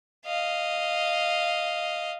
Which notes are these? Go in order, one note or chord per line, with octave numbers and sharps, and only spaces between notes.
D#5 F5